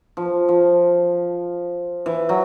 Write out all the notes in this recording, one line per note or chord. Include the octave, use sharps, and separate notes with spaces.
F3
F3
E3
F#3